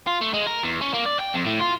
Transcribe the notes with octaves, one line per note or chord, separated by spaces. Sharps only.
F4
A3
G#3
A#4
E2
C#4
A#3
D5
G5
F2
A2
F4